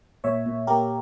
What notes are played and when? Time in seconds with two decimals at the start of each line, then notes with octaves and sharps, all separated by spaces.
0.24 A#2 C#5 E5
0.46 A#2
0.67 A#3 G4 A#4